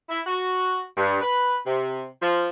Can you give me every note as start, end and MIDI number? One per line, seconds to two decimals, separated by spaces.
0.08 0.20 64
0.26 0.82 66
0.97 1.20 43
1.21 1.56 71
1.66 2.04 48
2.21 2.48 53